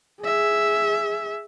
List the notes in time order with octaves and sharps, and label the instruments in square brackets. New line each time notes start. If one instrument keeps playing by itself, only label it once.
[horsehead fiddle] G#4 E5